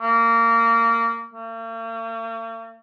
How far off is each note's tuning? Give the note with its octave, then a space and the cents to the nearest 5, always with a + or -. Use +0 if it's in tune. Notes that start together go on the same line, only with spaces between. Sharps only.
A#3 -20
A#3 -45